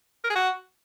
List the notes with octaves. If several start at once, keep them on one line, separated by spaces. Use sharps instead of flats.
A#4
G#4
F#4